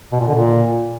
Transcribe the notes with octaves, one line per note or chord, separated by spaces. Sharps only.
B2
A#2
D3
A#2